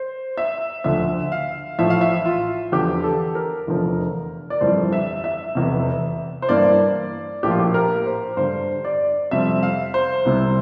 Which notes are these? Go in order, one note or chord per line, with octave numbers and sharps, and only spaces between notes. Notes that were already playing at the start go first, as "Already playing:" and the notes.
Already playing: C5
E5
D2 D3 F3 E5
F5
A1 A2 F3 E5
F5
E5
F4
E2 D3 F3 G4
A4
A#4
F1 E2 D3 F3
D5
G1 F2 E3 G3 C5
E5
E5
F1 E2 C3
C5
G2 E3 A#3 D5
A#1 A2 F3 A#3 G4
F4
G4
A#4
C5
G2 D3 G3 C5
D5
F2 C3 G3 C4 E5
F5
C5
C2 C3 G3 C4